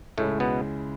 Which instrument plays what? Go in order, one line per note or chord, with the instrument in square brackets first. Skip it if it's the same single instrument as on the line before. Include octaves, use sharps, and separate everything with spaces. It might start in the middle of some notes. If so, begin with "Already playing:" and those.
[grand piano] C#2 C#3 G#3 C#4 E4 [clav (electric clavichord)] A2 A3
[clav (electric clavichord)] B2 B3